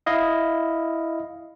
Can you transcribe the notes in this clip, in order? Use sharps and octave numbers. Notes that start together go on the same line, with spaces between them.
E4 D#5 F5